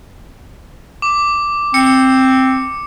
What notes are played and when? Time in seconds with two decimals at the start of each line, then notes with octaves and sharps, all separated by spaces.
1.02 D6
1.74 C4 C#7